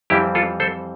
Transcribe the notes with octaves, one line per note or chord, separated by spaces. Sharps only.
F2 E3 G3 C4 E4 G4
F4 A4
A4 C5